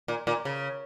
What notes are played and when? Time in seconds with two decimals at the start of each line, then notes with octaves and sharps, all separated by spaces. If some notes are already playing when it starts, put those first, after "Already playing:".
0.08 A#2
0.27 A#2
0.45 C#3